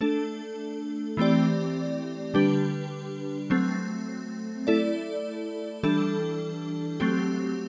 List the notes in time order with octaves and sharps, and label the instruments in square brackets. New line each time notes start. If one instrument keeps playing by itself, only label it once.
[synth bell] A3 D4 A4
E3 A3 C4 G4 D5
D3 G3 D4 G4 B4
F#3 A3 C4
A3 E4 A4 D5
E3 G3 D4 A4
F#3 A3 C4 G4